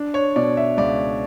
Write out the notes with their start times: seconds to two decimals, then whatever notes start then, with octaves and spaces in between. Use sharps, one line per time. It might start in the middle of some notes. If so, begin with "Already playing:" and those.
Already playing: D4
0.14 C#5
0.36 B2 D5
0.57 E5
0.77 C#2 D5